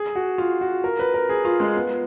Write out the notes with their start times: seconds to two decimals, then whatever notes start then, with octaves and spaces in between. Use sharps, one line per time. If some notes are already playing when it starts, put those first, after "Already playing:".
Already playing: G#4
0.15 F#4
0.38 F4
0.61 F#4
0.84 A#4
0.99 B4
1.14 A#4
1.29 G#4
1.45 F4
1.60 G#3
1.75 B3